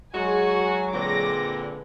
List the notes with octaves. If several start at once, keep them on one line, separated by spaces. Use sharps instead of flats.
F#3 G#3 F#4 A#4 G#5
A#2 D3 C4 G#4 B4 F#5 D6 A#6